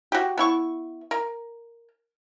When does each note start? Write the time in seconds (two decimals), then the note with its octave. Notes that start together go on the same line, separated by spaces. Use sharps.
0.12 F#4 G4
0.38 B3 E4 C#6
1.11 A#4